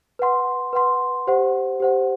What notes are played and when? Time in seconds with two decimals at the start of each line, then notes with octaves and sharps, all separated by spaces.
0.19 B4 F#5 C6
0.73 B4 F#5 C6
1.27 G4 C5 F#5
1.80 G4 C5 F#5